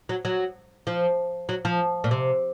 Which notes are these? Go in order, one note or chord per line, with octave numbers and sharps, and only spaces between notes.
F#3
F#3
F3
F#3
F3
A#2
C3